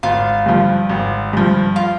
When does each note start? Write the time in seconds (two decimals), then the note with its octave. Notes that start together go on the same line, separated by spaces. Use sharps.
0.03 G#1 F4
0.46 G2 F3
0.89 G#1
1.33 G2 F3
1.76 F4